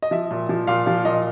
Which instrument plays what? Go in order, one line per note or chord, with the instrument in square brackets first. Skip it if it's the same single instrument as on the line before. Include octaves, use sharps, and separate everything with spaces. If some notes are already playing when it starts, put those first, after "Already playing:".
[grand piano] D#5
F3 E5
A#2
F3
A#2 F5
F3 F5
A#2 D#5